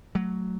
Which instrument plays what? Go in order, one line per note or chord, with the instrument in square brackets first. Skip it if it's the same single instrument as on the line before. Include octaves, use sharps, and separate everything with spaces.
[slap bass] F#3 A3